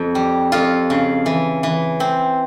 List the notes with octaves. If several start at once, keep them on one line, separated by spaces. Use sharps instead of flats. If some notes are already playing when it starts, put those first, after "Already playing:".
Already playing: F2
G3
F2 F4
C#3
E3
E3
C4